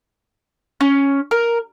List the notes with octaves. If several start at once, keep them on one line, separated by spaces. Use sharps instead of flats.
C#4
A#4